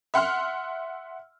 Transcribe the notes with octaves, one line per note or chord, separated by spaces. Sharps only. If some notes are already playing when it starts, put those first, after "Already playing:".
E5 F#5 C6 F6